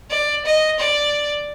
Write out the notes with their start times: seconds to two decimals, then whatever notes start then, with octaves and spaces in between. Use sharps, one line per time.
0.10 D5
0.45 D#5
0.80 D5